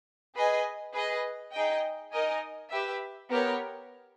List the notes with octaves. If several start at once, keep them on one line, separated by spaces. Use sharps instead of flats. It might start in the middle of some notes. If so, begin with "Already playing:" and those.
G#4 B4 D#5 G#5
G#4 B4 D#5
D#4 G#4 D#5 G5
D#4 A#4 D#5 G#5
G4 B4 E5
B3 G4 A#4 C#5